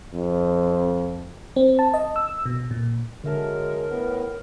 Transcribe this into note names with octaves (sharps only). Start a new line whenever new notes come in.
F2
C4
A5
D#5
E6
B2
A#2
D3 F#3 G#3 A#4 E5 A5
A2 B3 B4